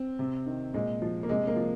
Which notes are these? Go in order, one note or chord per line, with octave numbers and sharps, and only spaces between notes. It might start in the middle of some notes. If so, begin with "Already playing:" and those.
Already playing: C4
C3
D#3
A#2 G#3
F3
A#3
C3 G#3
A#3
F3